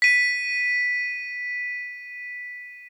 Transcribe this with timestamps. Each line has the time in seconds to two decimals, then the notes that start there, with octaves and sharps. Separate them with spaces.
0.02 B6 D#7